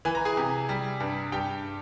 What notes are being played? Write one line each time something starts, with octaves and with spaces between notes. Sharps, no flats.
E3 G#5
A#5
G#4 G#5
C3
G3
G2
G2 G4 G5